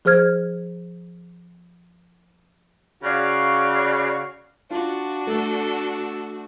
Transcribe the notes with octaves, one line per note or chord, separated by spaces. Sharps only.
F3 G#4 C5 F6 G#6
C#3 F#4 D5 F5
D4 F4 F#4
A3 A4